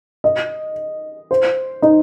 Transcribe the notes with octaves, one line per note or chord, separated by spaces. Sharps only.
D#5
C5
D#4